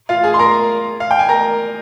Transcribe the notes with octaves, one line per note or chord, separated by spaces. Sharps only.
F4 F5
G#4 G#5
C6
A#4 A#5
F5
G5
G#5
A#4 A#5